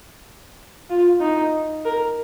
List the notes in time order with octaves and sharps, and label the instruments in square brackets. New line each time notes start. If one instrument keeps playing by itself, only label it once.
[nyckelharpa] F4
D#4
A#4